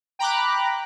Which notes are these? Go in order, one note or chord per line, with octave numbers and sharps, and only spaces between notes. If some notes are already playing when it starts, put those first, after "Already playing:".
G5 A#5 B5 D6 F#6